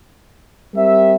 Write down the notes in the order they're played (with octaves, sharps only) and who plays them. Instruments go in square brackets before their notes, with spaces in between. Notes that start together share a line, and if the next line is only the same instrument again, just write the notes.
[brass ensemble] G3 C4 G4 A#4 E5